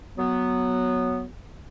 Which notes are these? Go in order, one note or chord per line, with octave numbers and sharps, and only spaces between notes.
F#3 B3